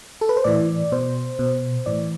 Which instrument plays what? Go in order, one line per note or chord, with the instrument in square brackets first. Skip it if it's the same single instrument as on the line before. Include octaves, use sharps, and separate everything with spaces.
[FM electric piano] A4
B4
C5
A2 E3 D5
B2 C5
B2
A2 E3 D5